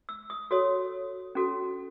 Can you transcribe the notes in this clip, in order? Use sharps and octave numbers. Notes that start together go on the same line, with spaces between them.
E6
D#6
F#4 A4 C#5 D#6
C#4 F#4 A4